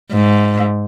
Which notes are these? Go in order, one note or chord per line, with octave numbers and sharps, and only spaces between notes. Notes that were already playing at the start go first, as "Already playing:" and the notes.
G#2